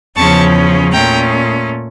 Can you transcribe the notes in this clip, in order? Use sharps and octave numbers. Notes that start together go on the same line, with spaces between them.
E2 C#3 F3 C#4 A5 C#6
A#2 A3 C#4 G5 A#5